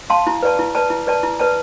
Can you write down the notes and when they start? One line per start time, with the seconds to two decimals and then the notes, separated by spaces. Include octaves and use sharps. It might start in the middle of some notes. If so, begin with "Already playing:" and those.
0.10 F5 A5 C6
0.27 E4
0.43 B4 D5 A5
0.59 E4
0.75 B4 D5 A5
0.90 E4
1.07 B4 D5 A5
1.23 E4
1.39 B4 D5 A5